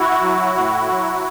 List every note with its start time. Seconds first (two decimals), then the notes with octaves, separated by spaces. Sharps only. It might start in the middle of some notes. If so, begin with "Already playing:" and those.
Already playing: E4 F#4
0.22 F#3
0.56 A2
0.90 F#3